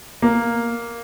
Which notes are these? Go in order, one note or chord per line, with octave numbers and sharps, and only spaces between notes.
A#3